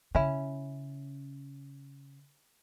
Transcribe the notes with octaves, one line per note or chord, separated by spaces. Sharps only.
C#3 C#4 E4